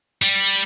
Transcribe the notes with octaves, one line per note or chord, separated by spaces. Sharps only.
G3